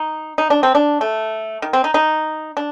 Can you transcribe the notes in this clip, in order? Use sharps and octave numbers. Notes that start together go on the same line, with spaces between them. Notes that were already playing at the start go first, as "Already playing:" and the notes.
Already playing: D#4
D#4
D4
C4
D4
A3
D#3
C4
D#4
D#4
D4